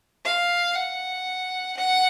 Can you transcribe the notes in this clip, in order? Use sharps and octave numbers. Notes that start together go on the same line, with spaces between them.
F5
F#5
F#5